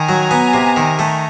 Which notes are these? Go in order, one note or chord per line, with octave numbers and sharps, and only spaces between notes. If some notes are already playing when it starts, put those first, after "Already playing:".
Already playing: D#3 G#5 A#5
F#3
B3
C3
D#3
A3